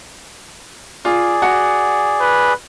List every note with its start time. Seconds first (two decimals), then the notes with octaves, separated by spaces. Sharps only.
1.05 F4 G#4 D5
1.42 F#4 F#5
2.21 B4